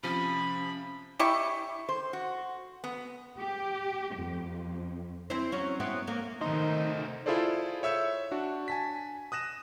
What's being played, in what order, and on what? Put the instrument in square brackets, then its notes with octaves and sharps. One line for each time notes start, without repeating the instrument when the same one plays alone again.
[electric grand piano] C3 F3 [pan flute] C#4 [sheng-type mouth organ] B5
[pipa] E4 G4 C#6
[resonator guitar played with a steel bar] C5
F#4
B3
[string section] G4
F2
[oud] C4 E4 C5
F#3 C#4
B3 C4 E4
A#3
[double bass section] C3 D#3 [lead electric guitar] A3 C5 [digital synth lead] D#4
[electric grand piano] E4 F4 G#4 A4 C5 D5
C#5 E5 E6 G6 C#7
D4 F#4
G#5 A5 B6
D#6 F#6 A#6 E7